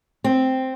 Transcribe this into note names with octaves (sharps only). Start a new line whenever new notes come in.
C4